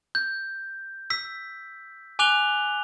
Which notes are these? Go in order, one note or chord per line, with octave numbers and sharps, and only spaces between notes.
G6
E6 B6
G#5 D6 F#6 F7 G7